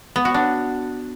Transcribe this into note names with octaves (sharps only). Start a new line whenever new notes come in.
B3
F#4
D4